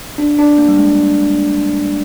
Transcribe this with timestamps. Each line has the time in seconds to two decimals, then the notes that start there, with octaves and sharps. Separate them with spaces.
0.18 D4
0.39 D4
0.58 A#3
0.68 G3
0.78 G#3